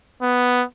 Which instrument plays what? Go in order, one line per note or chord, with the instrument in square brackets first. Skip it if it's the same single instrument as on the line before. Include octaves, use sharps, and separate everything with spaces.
[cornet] B3